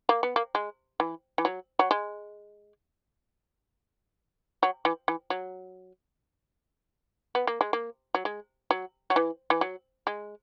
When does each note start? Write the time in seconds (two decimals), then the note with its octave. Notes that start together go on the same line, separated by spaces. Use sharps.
0.09 A#3
0.23 B3
0.36 A#3
0.55 G#3
1.00 E3
1.38 E3
1.45 F#3
1.79 F#3
1.91 G#3
4.63 F#3
4.85 E3
5.08 E3
5.30 F#3
7.35 B3
7.47 A#3
7.61 G#3
7.73 A#3
8.15 F#3
8.25 G#3
8.71 F#3
9.10 F#3
9.16 E3
9.50 E3
9.61 F#3
10.07 G#3